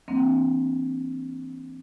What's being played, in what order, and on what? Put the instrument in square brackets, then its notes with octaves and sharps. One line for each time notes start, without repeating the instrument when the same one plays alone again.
[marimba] E3 F#3 A#3 C4 D4